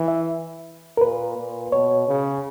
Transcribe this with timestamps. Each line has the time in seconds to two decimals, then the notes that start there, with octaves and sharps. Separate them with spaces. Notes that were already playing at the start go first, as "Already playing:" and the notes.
Already playing: E3
0.08 E5
0.97 A#4
1.01 A#2 B4
1.37 A#2
1.72 B2 C#5
2.08 C#3